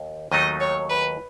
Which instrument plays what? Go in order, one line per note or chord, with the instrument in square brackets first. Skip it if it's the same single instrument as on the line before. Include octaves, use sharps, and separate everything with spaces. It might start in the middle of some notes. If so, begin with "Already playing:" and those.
Already playing: [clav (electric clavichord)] D#2
[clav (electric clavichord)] D#2 D#3 F#3 A3 D#4 [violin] D#5
[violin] C#5
B4